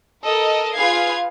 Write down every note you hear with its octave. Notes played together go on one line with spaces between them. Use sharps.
A4 A#4 D#5
F4 G#4 B4 F5 G#6 C7